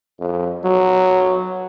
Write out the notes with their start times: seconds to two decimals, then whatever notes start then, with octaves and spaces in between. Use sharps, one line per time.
0.20 F2
0.64 F#3